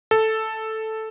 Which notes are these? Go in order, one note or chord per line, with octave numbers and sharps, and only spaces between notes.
A4